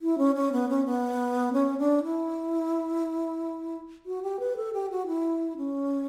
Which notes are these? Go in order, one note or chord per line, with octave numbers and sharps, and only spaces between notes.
E4
C#4
C#4
B3
C#4
B3
C#4
D4
E4
F#4
G4
B4
A4
G4
F#4
E4
C#4